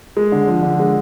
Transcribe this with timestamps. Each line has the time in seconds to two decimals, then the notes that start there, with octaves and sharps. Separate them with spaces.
0.17 G#3
0.32 D3
0.47 F3
0.63 D3
0.79 G#3